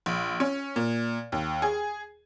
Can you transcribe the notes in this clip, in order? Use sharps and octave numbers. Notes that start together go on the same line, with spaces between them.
A#1
C#4
A#2
D#2
G#4